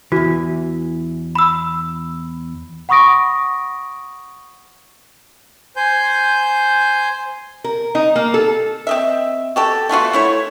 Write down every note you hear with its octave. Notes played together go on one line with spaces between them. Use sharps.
E2 E3 F#4
B5 E6
F#5 B5 C#6 D#6 A#6 D7
C5 G#5 G6
A#4
D#4
A#3
A4
C4 D#5 E5
F#4 G4 A4
A3 B3 F4 F#4
A3 E4 C#5